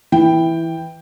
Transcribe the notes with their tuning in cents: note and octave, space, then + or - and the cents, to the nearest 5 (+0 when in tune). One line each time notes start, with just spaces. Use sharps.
E3 +0 G5 +5